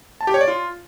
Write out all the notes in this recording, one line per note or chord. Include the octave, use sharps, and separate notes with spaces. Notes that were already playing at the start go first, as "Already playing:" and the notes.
A5
G4
C#5
D5
F4